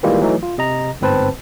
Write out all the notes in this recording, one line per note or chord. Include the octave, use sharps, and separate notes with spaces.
D#3 E3 G3 G#3 A#3 F4
E3 F#3 A3 D#4
F4
C3 D#5 A#5
G1 G#2 C4 B4 C5 A5